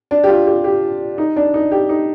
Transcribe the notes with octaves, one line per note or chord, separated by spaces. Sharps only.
D4
G4
F4
G4
G4
D#4
D4
D#4
G4
D#4